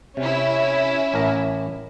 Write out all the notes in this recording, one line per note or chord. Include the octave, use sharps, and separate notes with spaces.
C3 C#4 E4
A1 A#4 A#5